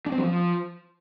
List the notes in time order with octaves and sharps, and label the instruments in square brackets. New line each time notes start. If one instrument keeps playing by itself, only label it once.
[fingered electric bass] D4
C4
F#3
F3